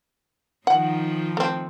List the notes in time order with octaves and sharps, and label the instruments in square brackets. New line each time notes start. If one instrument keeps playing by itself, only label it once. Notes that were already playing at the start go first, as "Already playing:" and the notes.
[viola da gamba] D#3 F3 D#4 [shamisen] F#5
[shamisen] A3 C4